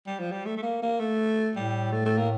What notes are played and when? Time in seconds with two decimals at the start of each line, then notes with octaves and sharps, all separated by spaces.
0.07 G3
0.19 F3
0.32 G3
0.45 A3
0.57 A3
0.62 A#3
0.82 A#3
1.00 A3
1.56 A2 G3
1.92 A3
2.05 A3
2.17 A#3